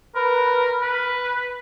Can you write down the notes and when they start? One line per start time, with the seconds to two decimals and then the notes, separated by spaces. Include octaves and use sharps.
0.16 A#4 B4
0.81 B4
1.35 B4